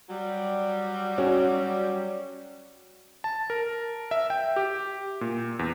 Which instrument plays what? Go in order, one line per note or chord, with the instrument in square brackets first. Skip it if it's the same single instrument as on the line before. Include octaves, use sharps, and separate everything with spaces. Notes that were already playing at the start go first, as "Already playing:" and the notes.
[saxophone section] F#3 G3
[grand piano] C#4 F#4
[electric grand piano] A5
A#4
E5
G5
G4
A#2
E2